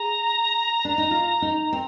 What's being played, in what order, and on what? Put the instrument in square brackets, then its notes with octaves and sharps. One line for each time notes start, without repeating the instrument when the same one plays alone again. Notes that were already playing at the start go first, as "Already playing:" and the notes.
Already playing: [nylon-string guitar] G#4 [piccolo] A#5
[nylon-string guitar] D4
D#4
F4
D#4
C4